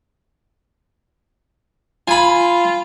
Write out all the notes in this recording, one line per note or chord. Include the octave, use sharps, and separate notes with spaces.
F4 G#5 B5